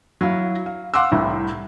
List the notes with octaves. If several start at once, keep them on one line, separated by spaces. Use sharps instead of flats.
F#3 E4 F5
F5
F5 F#5 C6 D6 E6
C2 A2